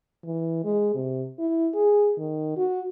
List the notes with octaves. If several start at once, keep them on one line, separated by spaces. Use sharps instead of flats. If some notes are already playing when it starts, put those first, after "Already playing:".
E3
G#3
C3
E4
G#4
D#3
F#4